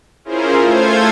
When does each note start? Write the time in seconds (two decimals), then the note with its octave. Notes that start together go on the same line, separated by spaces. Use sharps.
0.25 C#4 E4 F4 G#4 A#4 C5
0.62 A3 F4 A4 C5 G#6